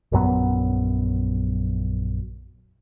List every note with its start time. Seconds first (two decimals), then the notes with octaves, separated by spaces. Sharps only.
0.12 A#1 F#2 F#3 B3